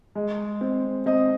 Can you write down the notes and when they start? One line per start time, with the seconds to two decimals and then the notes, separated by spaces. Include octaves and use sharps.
0.15 G#3
0.61 C4
1.06 C4 D#5